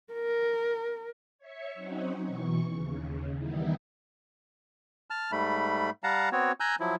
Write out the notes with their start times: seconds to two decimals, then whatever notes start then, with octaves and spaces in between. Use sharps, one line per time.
0.13 A#4
1.38 C#5 E5 C#6
1.74 F#3 C4 C#4 D#4 F#4
2.23 B2 E3 C#6
2.71 D#2 C#3
3.37 D#3 E3 G3 B3 D#4 E4
5.10 A5 F6
5.32 G#2 G3 A3 B5
6.04 G3 F5 F#5 A5 A#5
6.32 B3 C4 F#4 C#5
6.60 G#5 A#5 E6 F#6 G6
6.80 F3 F#3 E4